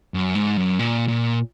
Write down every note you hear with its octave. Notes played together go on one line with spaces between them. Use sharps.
F#2
G#2
F#2
A#2
A#2